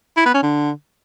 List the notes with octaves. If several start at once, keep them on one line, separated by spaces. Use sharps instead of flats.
E4
B3
C#4
D3